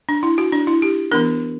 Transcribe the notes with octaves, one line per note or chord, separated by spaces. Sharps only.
D4
E4
F#4
D4
E4
G4
E3 B3 D4 A#4